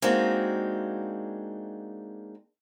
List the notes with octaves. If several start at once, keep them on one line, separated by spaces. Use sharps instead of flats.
G#3 A#3 C4 D4 D#4 F#4